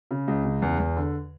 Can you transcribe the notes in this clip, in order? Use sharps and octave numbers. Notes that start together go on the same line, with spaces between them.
C#3
C#2
C#3
E2
E2
D3